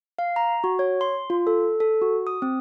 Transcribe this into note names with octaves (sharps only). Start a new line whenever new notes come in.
F5
A#5
F#4
C#5
C6
F4
A4
A4
F#4
D#6
C4